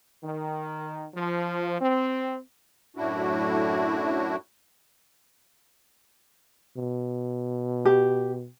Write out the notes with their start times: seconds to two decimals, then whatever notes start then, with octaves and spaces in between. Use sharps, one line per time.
0.23 D#3
1.15 F3
1.80 C4
2.96 F#2 A2 A3 D4 E4 F#4
6.77 B2
7.85 G4